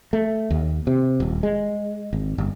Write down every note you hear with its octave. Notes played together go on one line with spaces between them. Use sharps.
A3
D#2
C3
D#1
G#3
G#1
G1